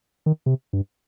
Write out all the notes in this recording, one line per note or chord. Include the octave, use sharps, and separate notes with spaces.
D#3
C3
G2